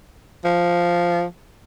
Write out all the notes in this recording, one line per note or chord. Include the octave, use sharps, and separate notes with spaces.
F3